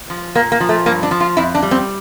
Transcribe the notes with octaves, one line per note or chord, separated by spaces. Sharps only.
F3
A#2 A#3
A#3
F3
A3
G2 A#3
D4
F3
F4
F2 E4
D4
G3
C4